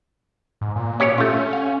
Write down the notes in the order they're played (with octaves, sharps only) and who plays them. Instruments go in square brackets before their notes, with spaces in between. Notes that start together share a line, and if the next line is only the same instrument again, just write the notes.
[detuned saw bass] G#2
A#2
[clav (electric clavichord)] C#4 G4 C#5
[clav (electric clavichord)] A3 F4 [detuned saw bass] C#4
[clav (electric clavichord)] F5